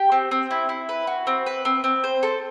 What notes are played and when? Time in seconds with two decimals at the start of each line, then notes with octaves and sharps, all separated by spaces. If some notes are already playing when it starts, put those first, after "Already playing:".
Already playing: G4
0.12 C4
0.31 C4
0.51 E4
0.69 E4
0.89 B4
1.07 F#4
1.27 C4
1.46 B4
1.65 C4
1.84 C4
2.04 C5
2.23 A4